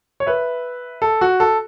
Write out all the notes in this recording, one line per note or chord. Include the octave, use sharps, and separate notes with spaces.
C#5
B4 E5
A4
F#4
A4